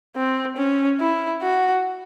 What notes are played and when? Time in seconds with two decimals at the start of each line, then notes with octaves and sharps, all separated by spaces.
0.16 C4
0.57 C#4
1.00 E4
1.42 F#4